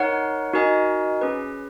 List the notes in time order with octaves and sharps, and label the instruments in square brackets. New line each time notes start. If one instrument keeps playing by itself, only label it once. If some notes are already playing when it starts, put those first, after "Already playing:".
Already playing: [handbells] D#4 A#4 C#5 F#5
D#4 F#4 A#4 D#5 G#5
C#4 G#4 B4